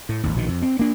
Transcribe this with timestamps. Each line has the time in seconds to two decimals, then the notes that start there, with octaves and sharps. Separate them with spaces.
0.09 A2
0.23 G#1 D#2
0.34 A#1 B2 D#3
0.48 F2
0.62 C4
0.79 A#3 D4